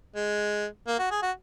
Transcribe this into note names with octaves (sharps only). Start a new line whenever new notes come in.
G#3
A#3
F#4
G#4
F#4